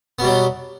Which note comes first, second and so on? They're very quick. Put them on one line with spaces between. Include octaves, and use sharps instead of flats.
B3 B2 G3 F#3